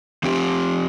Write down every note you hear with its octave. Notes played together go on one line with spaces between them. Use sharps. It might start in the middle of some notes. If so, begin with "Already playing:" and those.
F3 C4 G4